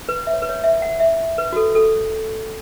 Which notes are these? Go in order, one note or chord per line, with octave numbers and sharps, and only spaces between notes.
B4
E5
C#5
B4
C#5
E5
F#5
E5
B4
F#4
A4
A4